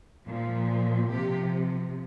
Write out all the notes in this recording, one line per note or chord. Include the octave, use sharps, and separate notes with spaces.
A#2 F3
C3 F3 G4